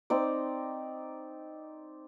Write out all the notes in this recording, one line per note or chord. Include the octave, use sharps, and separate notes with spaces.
C4 D#4 D5